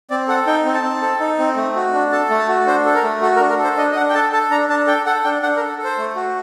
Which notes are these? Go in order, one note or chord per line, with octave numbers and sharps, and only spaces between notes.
C4 D5
A4 F#5
D#4 G5
C4
A5
C4
A4
D#4
C4
A3
F#4
D4
A4 A5
A3
A5
F#4
D4 C5
A4
A#4
A3
F#4 A4
A#4
D4
A#4
A4 C5
D4 D#5
D#5
D4 F#5
G5
A4 A5
A4 A5
D4 A#5
D4 A5
A4 G5
A4 F#5
D4 G5
D4 F#5
A#4
A4
A4
C5
A3
F#4